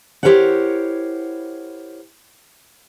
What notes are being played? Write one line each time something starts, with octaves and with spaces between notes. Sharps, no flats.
E4 G4 A#4 C5 C#5 F#5